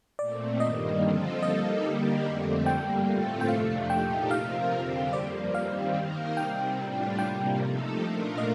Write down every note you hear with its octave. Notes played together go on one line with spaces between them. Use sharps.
A#2 A3 C4 D5
G2 D#3 G3 A#3 D#5
D3 F3 C4 F4 A4
G3 A#3 D#4 A4 D#5
D3 G3 A#3 D4 G4
F2 D3 A3 C4
G2 D3 G3 A#3 G5
A2 A3 C4 F4 A4
G5
F2 C3 F3 A3 D4 F5
A#2 A3 D#4 G4 G5
C3 F3 C4 F4 A#4 F5
F2 D3 G3 C4 G4
G2 F3 A#3 D5
D#3 G3 C4 F5
D#3 A#3 D#4 A#4
C3 G3 C4 G5
A2 G3 D4 F4
C3 G3 A#3 G5
C3 F3 A3 D#4 A4
A#2 A3 D4 F4 A#4
D#5